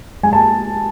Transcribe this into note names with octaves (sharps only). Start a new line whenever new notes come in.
G#3 G#5
A5